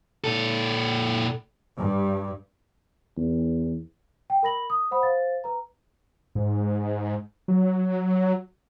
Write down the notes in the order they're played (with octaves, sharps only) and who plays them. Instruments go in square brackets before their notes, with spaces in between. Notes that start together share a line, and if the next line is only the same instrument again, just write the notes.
[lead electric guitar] A#2 A4
[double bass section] G2
[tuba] E2
[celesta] G5
A#4 B5 A#6 F#7
D#6
C5 F#5 B5 D#6
C5 F5 A6
B4 A#5
[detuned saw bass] G#2
F#3